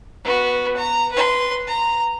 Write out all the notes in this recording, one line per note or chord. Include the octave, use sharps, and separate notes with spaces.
B3 F#4
A#5
B4 C6
A#5